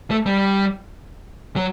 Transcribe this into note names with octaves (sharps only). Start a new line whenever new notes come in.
A3
G3
F#3